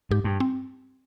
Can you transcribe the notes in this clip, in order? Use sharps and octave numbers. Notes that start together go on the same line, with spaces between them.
G#2 G4
G2
C4